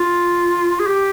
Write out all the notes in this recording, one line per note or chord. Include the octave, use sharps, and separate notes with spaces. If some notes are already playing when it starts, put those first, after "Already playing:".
Already playing: F4
G#4
G4